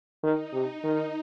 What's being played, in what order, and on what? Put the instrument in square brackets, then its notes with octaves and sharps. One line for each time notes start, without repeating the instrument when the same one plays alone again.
[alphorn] D#3 [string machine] D#4
[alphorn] C3 [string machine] D#4
[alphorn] D#3